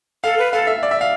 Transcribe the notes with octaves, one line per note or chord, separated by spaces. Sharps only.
A4 F5
B4
A4 F5
E5
D5
E5
F5